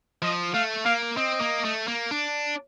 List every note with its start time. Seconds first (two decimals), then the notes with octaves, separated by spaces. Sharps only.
0.22 F3 D#5
0.54 A3 F5
0.85 A#3 F5
1.17 C4 D#5
1.41 A#3
1.65 A3
1.88 A#3
2.11 D4